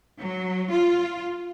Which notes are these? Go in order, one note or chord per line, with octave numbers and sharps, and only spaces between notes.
F#3
F4